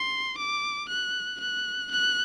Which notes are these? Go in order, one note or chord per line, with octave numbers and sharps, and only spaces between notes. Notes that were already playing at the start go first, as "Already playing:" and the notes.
Already playing: C6
D6
F#6
F#6
F#6